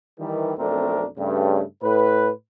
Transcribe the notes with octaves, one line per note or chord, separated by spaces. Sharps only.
D#3 E3 G3
B1 F2 A3 C4 D4 A#4
G2 C#3 A3
A2 B4